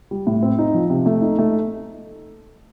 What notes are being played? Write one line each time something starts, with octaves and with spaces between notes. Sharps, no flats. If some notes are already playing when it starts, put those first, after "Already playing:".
G3
A2
C4
D#4
F3
C3
A3
D#4
A3